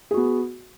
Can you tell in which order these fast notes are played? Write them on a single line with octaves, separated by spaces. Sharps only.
G#4 F#4 B3